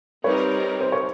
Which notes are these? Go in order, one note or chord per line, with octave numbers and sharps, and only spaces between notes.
G3 C4 D#4 G4 A#4 B4 C#5
C5
C#5